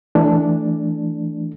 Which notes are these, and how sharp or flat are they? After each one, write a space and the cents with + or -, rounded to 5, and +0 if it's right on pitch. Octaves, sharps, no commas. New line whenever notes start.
E3 +0 A3 +0 D4 +0